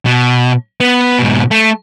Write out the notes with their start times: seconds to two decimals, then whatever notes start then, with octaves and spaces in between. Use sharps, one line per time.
0.06 B2
0.80 B3
1.19 G#2 B2
1.51 A3